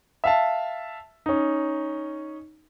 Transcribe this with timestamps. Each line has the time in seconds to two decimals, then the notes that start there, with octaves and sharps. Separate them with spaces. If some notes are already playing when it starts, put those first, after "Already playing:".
0.24 E5 F5 A5
1.26 C#4 D#4